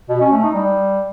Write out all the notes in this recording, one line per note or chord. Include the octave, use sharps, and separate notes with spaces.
B2
C#4
A3
D#4
G3